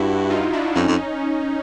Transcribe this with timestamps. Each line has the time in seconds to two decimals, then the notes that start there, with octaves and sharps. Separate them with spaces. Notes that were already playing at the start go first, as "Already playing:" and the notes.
Already playing: G2 E4 F#4
0.30 D#4 F4
0.53 D4 E4
0.75 F2 C#4 D#4
0.88 F2